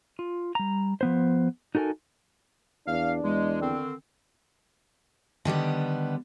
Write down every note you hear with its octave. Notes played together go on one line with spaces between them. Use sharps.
F4
G3 A#5
F3 B3 C5
D#4 F#4 A4 A#4 G#5
E2 D4 F5
E2 G#3
D3 D#3 C4
D3 D#3 G3 B3